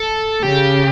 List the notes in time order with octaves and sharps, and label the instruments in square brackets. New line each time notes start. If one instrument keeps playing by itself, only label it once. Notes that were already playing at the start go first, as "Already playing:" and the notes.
Already playing: [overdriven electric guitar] A4
[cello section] C#3 [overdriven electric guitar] G4